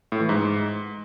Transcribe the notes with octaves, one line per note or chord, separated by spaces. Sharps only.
A2
E3
G#2